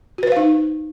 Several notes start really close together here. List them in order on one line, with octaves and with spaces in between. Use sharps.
F#4 B4 C5 F5 D#4